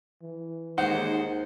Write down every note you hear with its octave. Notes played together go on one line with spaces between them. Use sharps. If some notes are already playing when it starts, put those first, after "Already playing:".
E3
D#2 G#3 D#4 C5 F#5